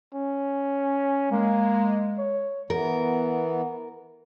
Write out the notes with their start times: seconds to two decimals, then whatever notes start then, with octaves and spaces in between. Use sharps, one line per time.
0.13 C#4
1.32 G#3 A#3
2.18 C#5
2.70 E3 B3 A#4